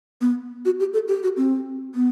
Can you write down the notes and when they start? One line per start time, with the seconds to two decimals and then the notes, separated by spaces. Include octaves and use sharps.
0.21 B3
0.65 F#4
0.80 G4
0.93 A4
1.08 G4
1.23 F#4
1.37 C4
1.95 B3